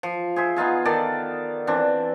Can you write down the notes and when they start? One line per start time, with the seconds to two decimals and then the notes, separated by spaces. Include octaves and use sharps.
0.03 F3
0.36 G#4 C5 E5
0.56 B3 D#4 F4 G#4
0.85 D#3 A4 D5
1.67 E3 C4 D4